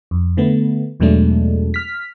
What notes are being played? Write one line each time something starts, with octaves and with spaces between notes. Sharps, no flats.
F2
D3 A3 B3
E2 B2 F#3 G#3 A3 D4
F6 B6